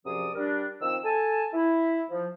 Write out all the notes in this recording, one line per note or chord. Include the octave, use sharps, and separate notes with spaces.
F#2 C3 F3 G#4 D5 D#6
G3 D4 A#4
D#3 F3 C4 E6
A4 G#5 A5
E4
F3